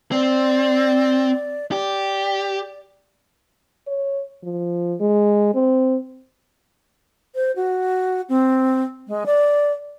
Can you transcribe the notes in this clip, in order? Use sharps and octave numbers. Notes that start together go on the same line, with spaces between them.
C4 D5
G4 D5
C#5
F3
G#3
C4
C5
F#4
C4
G#3
D5